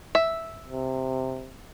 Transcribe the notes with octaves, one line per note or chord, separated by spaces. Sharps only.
E5
C3